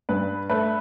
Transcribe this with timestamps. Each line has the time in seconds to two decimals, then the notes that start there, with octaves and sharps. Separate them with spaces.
0.09 G2 B4
0.50 A3 B4